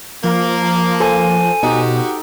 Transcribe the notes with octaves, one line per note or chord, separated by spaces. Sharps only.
F3 A#3
A4 C5 G#5
B2 D#4 F#4 G4